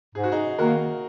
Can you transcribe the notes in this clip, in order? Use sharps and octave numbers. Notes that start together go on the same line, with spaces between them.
G#2 G#4
F#4
D#4 G#4
D#3 A#3 F#4 A#4